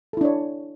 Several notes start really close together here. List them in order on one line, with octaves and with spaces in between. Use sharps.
A4 E4 D4 C#5